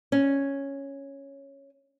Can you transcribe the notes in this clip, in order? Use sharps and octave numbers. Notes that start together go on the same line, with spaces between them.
C#4